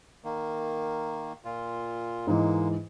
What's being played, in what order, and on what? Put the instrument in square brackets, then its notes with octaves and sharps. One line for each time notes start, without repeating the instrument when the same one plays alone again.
[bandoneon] D#3 A#3
A#2 F4
[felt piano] G#2 E3 [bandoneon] G#3 A#3